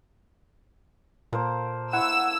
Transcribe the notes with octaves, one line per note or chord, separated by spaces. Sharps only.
A#2 A#3 A4 C5
E4 F#5 C#6 E6